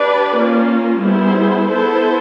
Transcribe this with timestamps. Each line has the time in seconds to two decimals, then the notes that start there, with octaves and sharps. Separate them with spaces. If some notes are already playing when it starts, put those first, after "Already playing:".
Already playing: D4 G4 B4 D5
0.35 A#3 C#4 F4
1.01 G3 B3 E4 G#4 C5
1.67 B3 E4 A4 C5